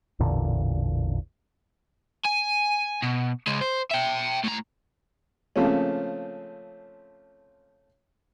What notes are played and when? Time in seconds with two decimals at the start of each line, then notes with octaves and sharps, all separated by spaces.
0.19 A1 E2 A#2 D3
2.25 G#5
3.03 B2
3.47 C#3 G#3
3.61 C5
3.91 E5 G5
4.44 A2 A#5
5.56 C#3 F3 A3 A#3 C4 C#4